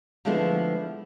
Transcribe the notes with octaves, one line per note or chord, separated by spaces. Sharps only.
D3 F3 G#3 A3 B3 E4